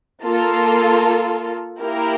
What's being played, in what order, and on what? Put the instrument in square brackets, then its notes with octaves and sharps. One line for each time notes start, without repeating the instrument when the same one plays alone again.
[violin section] A#3 F4 A4
A#3 E4 G4 A#4